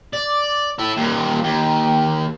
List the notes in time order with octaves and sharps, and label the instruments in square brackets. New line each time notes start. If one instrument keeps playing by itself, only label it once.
[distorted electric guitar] D5
E4 A4
D#2 A#2
D#2